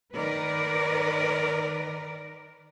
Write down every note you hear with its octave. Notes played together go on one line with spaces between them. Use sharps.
D#3 A#4 B4 D5